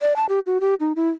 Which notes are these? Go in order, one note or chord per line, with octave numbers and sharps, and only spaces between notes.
D5
A5
G4
F#4
G4
D#4
E4